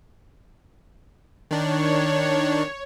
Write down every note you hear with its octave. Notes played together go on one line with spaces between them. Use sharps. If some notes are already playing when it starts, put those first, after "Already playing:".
D#3 D4 C#5